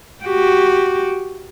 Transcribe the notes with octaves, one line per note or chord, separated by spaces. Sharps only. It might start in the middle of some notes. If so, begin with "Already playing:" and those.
F#4 G4